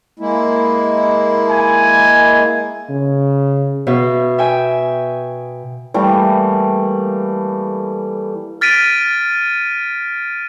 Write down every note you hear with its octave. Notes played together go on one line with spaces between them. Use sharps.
G#3 A#3 E4
G#5
C#3
B2 E5 F5
E5 G5 G#5
E3 G3 A3 A#3
F6 A6 B6 D7 D#7